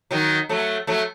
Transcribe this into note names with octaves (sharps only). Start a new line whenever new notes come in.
D#3 F#3
F#3 A3
F#3 A3